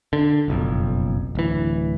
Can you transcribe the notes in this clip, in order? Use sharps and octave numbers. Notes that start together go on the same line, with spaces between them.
D3
F#1 B1 F2
D1 E3